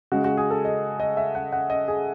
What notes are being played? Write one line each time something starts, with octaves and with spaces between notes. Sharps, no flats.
C#3 G#3 F#4
F#4
G#4
A4
D#5
D#5
E5
F#5
F#5
D#5
G#4